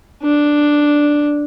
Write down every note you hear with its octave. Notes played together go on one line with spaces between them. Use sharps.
D4